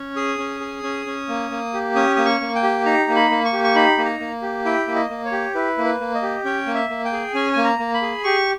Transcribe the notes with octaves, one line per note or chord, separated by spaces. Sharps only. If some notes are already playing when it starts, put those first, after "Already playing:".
Already playing: C#4
G#4 D#6
C#4
G#4
C#4
C#4
A#3
A#3
G4
C#4 D#6
A#3 D#6
C#6
A#3
G5
G4
D#4 A#5
A#3
B5
A#3
C#6
G4
C#6
D#4 B5
A#3
A#5
A#3
G4
E4 G5
A#3
D#5
A#3
C#5
G4
E4 B4
A#3
B4
A#3
D#5
G4
C#4 G5
A#3
E5
A#3
G5
G#4
C#4 G#5
A#3 G#5
A#5
A#3
B5
G#4
G4 C#6